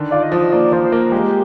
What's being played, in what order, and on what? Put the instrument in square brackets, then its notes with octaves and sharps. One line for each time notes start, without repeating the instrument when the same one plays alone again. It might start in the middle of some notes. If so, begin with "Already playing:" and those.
Already playing: [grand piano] D3 D#3
[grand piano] F4 [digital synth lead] D5
[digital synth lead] D#5
[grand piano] F3
[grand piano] A#3 [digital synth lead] D5
[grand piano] F3 [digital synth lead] C5
[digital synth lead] C5
[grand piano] A#3 [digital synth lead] A#4
[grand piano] G#3 [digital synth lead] G4